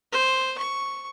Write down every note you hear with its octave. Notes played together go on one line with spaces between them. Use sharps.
C5
C#6